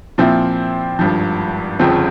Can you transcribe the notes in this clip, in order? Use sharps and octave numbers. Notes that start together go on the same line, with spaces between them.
A#2 F3 C4 E4
G#1 G2 F3
G1 F2 C#3 F3 C4